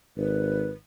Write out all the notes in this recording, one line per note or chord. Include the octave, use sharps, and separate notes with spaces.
G#1 B4